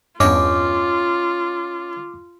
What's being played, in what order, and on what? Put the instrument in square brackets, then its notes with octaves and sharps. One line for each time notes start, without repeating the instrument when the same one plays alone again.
[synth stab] E2 G2 [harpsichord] C#4 D#5 G5 [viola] F4 [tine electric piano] D6